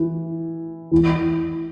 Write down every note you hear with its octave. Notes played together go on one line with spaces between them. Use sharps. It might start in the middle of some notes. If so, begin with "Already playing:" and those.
Already playing: E3
E3